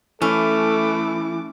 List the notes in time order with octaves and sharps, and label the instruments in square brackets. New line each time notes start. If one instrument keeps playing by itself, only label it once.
[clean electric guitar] E3 [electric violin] A3 D6 [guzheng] C#4 [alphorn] A4